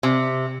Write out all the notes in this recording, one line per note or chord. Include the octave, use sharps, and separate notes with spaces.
C3